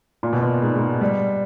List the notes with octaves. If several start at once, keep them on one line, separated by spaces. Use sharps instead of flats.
A#2
B2
A#2
G#2
G#2
G3